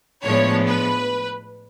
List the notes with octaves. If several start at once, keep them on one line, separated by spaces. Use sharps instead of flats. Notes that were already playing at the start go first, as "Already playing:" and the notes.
A2 F3 G#3 B3 D4 C#5
B4